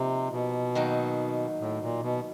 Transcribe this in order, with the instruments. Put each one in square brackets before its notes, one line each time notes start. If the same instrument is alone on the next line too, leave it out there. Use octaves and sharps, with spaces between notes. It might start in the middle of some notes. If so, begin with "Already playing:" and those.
Already playing: [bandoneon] C3 [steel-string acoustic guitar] F3 A#3 D#4
[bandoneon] B2
[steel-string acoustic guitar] D#3 F#3 A#3 D#4
[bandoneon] A2
A#2
B2